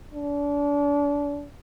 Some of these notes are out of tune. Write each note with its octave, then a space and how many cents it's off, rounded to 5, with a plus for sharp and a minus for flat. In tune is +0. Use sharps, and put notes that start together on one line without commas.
D4 -35